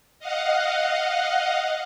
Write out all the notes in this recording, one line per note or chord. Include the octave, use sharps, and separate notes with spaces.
D#5 F5 F#5